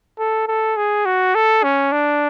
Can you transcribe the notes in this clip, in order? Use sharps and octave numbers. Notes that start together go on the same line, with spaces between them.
A4
A4
G#4
F#4
A4
C#4
D4